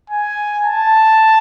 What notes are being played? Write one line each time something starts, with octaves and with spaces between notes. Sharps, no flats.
G#5
A5